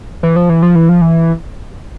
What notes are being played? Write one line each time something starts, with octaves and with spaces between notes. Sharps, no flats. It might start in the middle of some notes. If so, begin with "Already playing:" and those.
E3
F3
E3
F3
E3
F3
E3